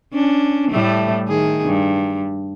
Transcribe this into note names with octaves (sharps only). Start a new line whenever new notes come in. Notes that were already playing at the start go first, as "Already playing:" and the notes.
C#4 D4
A2 G3 A3
D#3 G#4
G2